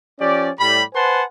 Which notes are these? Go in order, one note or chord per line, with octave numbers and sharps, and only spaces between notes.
F3 C#4 G4 D5
A2 G3 B5
B4 C5 F#5 G#5 A5 C6